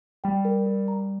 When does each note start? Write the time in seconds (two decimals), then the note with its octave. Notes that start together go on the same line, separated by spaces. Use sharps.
0.24 G3 G5
0.45 A#4
0.66 A#4
0.88 A#5